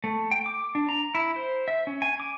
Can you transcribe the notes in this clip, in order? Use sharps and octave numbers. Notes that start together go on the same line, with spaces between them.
A3
G5
D6
D4
A#5
E4
C5
E5
C#4
G#5
D6